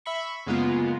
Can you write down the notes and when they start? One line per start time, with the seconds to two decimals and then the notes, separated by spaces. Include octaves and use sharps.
0.06 E5 B5 C#6
0.46 F#2 C#3 G#3 A#3 B3 F4